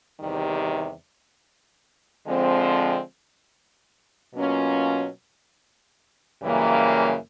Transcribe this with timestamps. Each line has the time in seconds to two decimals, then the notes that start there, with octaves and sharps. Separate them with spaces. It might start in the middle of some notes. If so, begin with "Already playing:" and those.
0.19 E2 C3 D#3 G3
2.27 D3 F3 G#3 C4
4.35 B2 F#3 A#3 C#4 F4
6.43 F#2 C#3 E3 G3 A#3